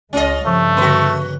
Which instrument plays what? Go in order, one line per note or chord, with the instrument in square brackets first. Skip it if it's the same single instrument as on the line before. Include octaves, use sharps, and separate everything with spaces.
[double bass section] C#2 G#3 [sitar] C#4 F4 D#5
[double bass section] G2 C#3 [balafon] F3 [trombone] A3
[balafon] D3 C6 [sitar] A#3 F#4